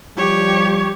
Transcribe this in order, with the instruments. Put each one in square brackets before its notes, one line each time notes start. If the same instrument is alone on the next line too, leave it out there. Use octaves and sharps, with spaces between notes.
[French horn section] F3 G3 [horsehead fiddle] G4 [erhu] C#5